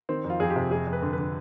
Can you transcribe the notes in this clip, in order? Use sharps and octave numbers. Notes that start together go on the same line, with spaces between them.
D#3 C4
F2
F4
F2 G#4
G4
C3
F2 G#4
F2
B4
D3
B4
D3